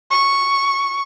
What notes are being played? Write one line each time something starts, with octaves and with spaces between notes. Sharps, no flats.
C#6